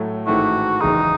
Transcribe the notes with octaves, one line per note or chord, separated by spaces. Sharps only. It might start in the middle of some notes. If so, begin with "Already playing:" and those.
Already playing: A2 F#3 A3
A1 G#2 D#3 A3 E4 F#4
F#1 E2 D#3 G#3 D#4